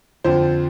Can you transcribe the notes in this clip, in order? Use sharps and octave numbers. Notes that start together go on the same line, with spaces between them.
F2 D3 F3 C5